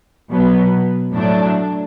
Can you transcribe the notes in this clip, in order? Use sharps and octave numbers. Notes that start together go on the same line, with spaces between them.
B2 F#3 B3
A2 F#3 A3 D4